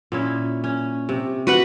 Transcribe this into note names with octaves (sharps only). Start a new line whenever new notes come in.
A#2 C#4 E4
C#4
C3
F#4 B4 F#5